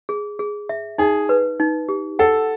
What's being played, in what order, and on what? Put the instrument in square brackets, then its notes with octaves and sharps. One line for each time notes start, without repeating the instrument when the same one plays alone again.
[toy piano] G#4
G#4
E5
[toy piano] D#4 [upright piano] G#4
[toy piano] B4
D#4
G4
[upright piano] A4 [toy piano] F#5